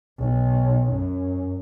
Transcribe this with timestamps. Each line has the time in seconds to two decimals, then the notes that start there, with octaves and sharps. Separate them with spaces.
0.19 B1
0.91 F#2